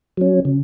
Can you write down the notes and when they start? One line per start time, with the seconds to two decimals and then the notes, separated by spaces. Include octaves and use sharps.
0.17 F#3 C#4
0.45 C#3